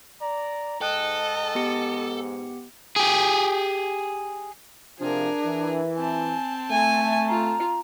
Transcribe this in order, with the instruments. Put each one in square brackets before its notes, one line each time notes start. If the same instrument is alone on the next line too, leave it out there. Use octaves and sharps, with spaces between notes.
[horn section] D5 A#5
[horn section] G#2 [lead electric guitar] A4 [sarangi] D#5 [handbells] G5 F#6
[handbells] B3 G4 C#7
[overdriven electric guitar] G4 G#4
[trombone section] C3 F3 [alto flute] D4 [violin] G#4 A#4
[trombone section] E3
[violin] C4 A5 [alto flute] G#5
[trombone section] A3 [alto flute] E5 [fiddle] G#5
[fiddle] F4 [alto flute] A#5